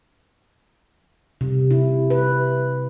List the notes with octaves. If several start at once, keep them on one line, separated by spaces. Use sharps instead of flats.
C3
E4
B4